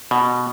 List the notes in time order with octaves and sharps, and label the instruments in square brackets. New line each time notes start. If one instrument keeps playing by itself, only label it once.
[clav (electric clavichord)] B2